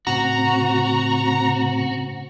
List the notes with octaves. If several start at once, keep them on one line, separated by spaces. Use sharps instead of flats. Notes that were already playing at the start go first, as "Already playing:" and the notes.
A2 C#3 C4 F#4 A#5